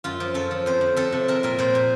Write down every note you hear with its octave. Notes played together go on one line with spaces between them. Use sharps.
F#2 F4
F3
F#2 A4
F3
F2 C5
F2
F2 A4
C3
C4 A#4
A#2 A#4
A#2 C5
A#2